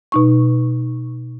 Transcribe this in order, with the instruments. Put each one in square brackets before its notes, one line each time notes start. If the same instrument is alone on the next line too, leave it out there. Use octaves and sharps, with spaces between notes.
[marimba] B2 D#4 C#6